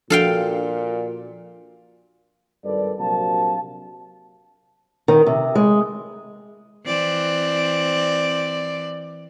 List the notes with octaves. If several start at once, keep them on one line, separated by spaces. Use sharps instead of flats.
A#2 F3 D4 F#4 A4 F5 G5
G#1 G2 G3 A4 B4 D5
A#1 C3 F#3 F#4 F5 A5
D#3
C3
G#3
E3 C4 D5